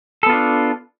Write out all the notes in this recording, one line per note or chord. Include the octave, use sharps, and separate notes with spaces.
B3 D4 F4 A4